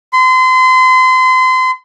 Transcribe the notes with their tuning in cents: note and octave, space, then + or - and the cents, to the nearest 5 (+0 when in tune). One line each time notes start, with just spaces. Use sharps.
C6 -30